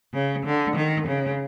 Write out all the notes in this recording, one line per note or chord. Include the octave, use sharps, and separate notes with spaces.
C#3
D3
D#3
C#3